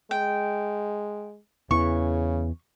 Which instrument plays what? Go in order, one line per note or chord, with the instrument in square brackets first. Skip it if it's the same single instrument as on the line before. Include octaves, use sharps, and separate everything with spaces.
[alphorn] G#3 [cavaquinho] G5
[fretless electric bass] E2 E3 [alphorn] C#3 [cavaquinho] C#6